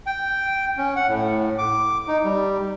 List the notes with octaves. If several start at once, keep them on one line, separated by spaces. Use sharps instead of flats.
G5
C#4
F#5
A2
D6
D#4
G3